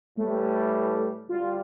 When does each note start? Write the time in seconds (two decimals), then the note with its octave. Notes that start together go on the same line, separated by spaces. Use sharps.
0.17 A2 E3 G3 A3
1.29 D2 D3 G3 F4